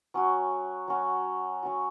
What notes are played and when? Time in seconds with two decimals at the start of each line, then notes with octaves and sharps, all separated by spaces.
0.14 F#3 C#4 F#4
0.88 F#3 C#4 F#4
1.63 F#3 C#4 F#4